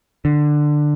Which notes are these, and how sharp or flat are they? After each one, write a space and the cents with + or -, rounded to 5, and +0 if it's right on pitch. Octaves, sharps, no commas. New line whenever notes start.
D3 +15